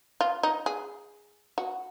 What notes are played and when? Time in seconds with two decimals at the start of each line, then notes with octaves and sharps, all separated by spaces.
0.21 F4
0.43 D#4
0.66 G#4
1.58 F#4